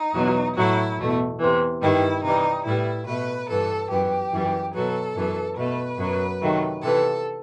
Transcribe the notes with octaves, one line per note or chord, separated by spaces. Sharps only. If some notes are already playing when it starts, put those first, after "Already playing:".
Already playing: D#4
E2 B2 F#3 B3
A2 F#3 A3 E4
E2 B2 A3
E2 C3 E3
G2 D#3 G3 B3 E4
C3 E3 G3 D#4
A2 G3 B3 E4
B2 A3 B4
G2 E3 B3 A4
F#2 E3 B3 G4
F#2 E3 G3 B3
B2 F#3 B3 A4
F#2 E3 B3
B2 A3 B4
F#2 F#3 B3
C3 D#3 F#3 A3
C3 E3 B3 A4